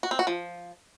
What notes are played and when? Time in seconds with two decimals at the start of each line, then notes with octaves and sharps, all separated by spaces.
0.03 F#4
0.11 C4
0.19 F#4
0.27 F3